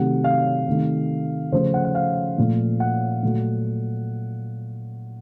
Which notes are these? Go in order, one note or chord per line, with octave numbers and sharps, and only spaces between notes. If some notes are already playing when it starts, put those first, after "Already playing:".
Already playing: C3 D#3 F#3 A3 F#5
F5
C3 D#3 A3
C#3 F3 A3 C5
F#5
F#5
F5
A#2 F3 A3
F#5
A#2 F#3 A3